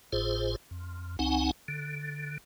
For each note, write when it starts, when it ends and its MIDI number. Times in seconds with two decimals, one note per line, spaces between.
0.13 0.56 32
0.13 0.56 45
0.13 0.56 65
0.13 0.56 68
0.13 0.56 72
0.71 1.17 41
1.19 1.51 37
1.19 1.51 60
1.19 1.51 63
1.19 1.51 78
1.19 1.51 80
1.68 2.38 50